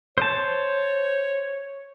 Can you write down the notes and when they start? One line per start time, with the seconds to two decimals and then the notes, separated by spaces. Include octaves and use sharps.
0.18 C5 C#5 A5